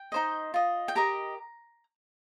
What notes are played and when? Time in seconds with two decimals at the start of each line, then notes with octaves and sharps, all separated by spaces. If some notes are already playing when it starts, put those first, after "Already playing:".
Already playing: G5
0.12 D#4 C5 D#5
0.54 F4 D#5
0.88 G5
0.96 G4 A#4 D#5 A#5